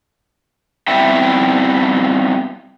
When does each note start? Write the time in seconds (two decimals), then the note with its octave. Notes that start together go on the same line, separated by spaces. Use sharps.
0.88 G3 B3 C4 E4 E5 G5